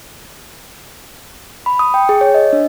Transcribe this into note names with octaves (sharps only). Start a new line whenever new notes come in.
B5
D#6
G5
G#4
C#5
D#5
D4